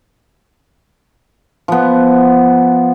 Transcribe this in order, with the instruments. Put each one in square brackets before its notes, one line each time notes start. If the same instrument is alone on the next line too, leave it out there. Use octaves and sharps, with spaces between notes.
[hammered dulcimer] F3 B3